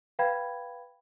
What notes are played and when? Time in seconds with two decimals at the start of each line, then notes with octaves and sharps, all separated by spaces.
0.19 B4 F5 G5 B5 G#6